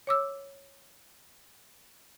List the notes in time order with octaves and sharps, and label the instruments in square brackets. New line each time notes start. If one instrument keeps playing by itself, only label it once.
[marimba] C#5 D6 E6